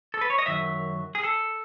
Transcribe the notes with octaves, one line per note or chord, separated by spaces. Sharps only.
A4
B4
C#5
D#5
F#2 D#3 F#3 E5
G#4
A4